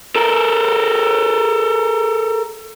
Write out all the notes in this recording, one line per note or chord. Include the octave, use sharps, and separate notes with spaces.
A4 A#4